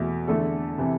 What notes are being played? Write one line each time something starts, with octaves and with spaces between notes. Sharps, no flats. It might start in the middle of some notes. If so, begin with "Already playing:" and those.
Already playing: E2 B2 A3
E2 D3 A3 A4
C3 E3